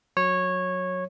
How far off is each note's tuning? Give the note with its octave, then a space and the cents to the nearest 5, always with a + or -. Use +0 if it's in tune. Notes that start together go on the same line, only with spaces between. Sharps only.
F#3 -20 C#5 -15